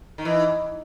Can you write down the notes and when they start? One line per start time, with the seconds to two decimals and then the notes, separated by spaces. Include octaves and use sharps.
0.18 D#3
0.25 E3